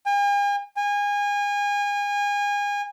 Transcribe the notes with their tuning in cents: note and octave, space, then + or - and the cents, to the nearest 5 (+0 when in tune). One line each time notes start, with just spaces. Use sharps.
G#5 -45
G#5 -30